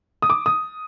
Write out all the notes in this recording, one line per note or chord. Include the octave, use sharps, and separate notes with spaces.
D#6
D6
D#6